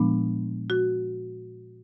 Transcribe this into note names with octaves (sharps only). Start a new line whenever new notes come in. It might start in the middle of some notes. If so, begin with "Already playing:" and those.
Already playing: A#2 F3 G#3 B3 D4
F#4